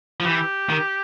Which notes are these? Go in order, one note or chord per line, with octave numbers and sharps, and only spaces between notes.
F3
E3 G4
D#3